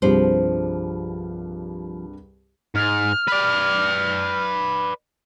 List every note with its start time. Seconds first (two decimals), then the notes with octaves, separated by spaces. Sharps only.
0.02 C2 G2 F3 D4 G#4 C5
2.75 G#2 F6
3.28 B4 D5